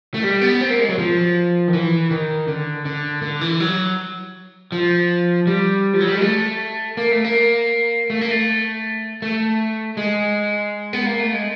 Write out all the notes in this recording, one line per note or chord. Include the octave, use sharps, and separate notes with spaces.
A3
G3
B3
C4
A#3
G#3
F#3
F3
D#3
E3
D#3
D3
D3
D3
E3
F#3
F3
G3
F3
F#3
G3
G#3
A3
A#3
A3
A#3
A3
A#3
A3
A3
G#3
B3
A#3
A3
G#3